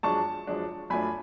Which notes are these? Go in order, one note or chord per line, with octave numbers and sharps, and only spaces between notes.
F#2 F3 G#3 D4 A5 C#6
F#2 F3 G#3 D4
F#2 F3 A3 D4 G#5 B5